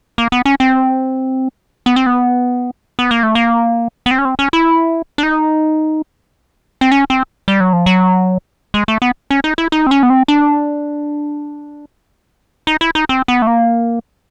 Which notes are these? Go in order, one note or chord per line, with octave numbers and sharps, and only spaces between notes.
A#3
B3
C#4
C4
B3
C4
B3
B3
A#3
A3
A#3
B3
C4
C#4
C4
C#4
E4
D4
D#4
C4
C#4
C4
G3
F#3
F3
F#3
G#3
A3
B3
C#4
D#4
E4
D#4
C4
C#4
B3
C4
D4
D#4
E4
D#4
C4
B3
A3
A#3